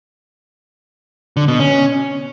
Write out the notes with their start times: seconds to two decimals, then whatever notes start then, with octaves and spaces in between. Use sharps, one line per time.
1.37 D3
1.48 B2
1.60 C#4